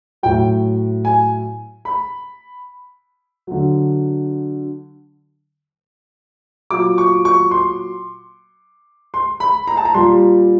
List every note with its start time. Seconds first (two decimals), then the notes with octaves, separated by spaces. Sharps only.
0.23 A2 F#3 G5
1.05 G#5
1.85 B5
3.47 D3 F#3
6.71 A#2 F#3 D6
6.98 C#6
7.25 C#6
7.51 C6
9.14 C6
9.40 B5
9.67 A#5
9.77 A5
9.85 A#5
9.94 A#2 G3 C6